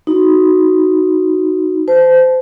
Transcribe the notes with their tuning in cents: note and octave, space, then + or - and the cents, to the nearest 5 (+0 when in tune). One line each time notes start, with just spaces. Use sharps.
D#4 +0 F#4 +0
C5 -25 A5 -20